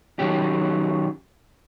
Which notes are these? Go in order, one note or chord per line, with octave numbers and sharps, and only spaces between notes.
D#3 F#3 C#4 G4